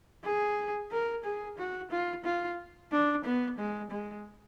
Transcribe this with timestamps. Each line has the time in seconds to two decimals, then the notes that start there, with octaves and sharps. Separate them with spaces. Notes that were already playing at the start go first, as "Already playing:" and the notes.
0.24 G#4
0.91 A#4
1.24 G#4
1.58 F#4
1.90 F4
2.24 F4
2.91 D4
3.25 B3
3.58 G#3
3.91 G#3